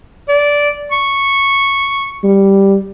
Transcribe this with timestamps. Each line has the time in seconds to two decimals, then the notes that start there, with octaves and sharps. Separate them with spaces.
0.29 D5
0.92 C#6
2.24 G3